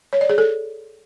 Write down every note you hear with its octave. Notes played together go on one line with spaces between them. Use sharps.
C#5
D5
G#4
A4